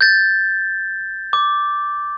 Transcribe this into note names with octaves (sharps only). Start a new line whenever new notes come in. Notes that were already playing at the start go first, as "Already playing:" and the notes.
G6 A6
D6